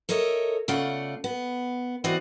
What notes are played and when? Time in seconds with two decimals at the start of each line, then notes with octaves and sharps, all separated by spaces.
0.09 A4 A#4 C#5 D#5 E5
0.68 C#3 A3 F4 D5 F#5
1.24 B3
2.04 E3 C4 F#4 D5 D#5